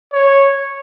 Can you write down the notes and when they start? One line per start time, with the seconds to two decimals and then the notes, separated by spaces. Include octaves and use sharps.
0.13 C#5